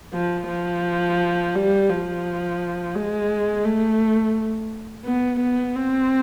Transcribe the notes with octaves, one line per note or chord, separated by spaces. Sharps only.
F3
F3
G3
F3
G#3
A3
B3
B3
C4